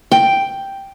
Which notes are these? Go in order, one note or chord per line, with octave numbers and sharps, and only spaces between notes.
G5